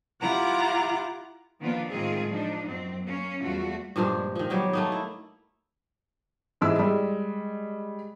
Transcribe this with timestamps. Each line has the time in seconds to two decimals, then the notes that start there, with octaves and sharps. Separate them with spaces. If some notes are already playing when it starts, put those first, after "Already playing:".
0.21 E4 F4 G4 F#5 A#5 D6
1.60 D#3 F3 A#3 B3 D4 F4
1.90 A2 D#3 G#3 C4 F4 G#4
2.28 F3 D4 D#4
2.66 F#2 C4
3.03 A#3 C#4
3.41 E2 G3 A3 F4 F#4
3.96 G2 A#2 F3 G#3
4.35 D#3 F3
4.50 B2 F#3 G3
4.73 A3 A#3 D#4
4.92 E4
6.61 G#2 E3 G#3 E4 E6
6.79 G3 G#3